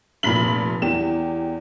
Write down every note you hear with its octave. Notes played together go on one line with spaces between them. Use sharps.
F1 A#2 B5 B6 F#7
E2 G4 E7